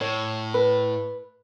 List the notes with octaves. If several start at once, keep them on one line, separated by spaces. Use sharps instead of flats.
A2 C#5
B4